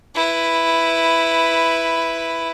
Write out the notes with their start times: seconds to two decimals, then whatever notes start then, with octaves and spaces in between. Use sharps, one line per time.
0.15 E4 B4